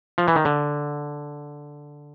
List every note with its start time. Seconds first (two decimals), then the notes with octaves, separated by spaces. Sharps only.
0.18 F3
0.28 E3
0.36 D#3
0.45 D3